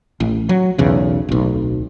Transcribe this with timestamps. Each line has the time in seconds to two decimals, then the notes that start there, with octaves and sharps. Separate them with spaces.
0.20 A1
0.49 F#3
0.78 B1 E2 C#3
1.29 D1 B1